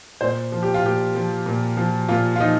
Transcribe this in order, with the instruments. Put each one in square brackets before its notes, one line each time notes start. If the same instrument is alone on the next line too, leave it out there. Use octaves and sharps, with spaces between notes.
[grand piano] A#2 C5
F3
G4
F4
A#2 G4
F3
A#2
F3
A#2 F4
F4
F3 D#4